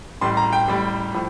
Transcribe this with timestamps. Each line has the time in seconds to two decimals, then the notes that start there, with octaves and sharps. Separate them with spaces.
0.21 A1 A2 G3 C6
0.37 A#5
0.53 G5
0.68 A1 A2 G3
1.14 A2 F3